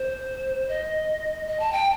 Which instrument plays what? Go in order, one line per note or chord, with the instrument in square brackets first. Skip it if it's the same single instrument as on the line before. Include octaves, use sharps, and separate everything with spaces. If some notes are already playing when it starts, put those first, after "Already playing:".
Already playing: [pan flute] C5
D#5
D#5
A5
G5